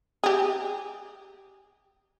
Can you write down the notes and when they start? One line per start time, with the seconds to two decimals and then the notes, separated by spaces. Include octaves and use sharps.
0.24 G4 G#4